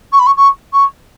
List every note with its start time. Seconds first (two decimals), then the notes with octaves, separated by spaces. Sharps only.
0.12 C#6
0.19 B5
0.26 C#6
0.37 C#6
0.73 C#6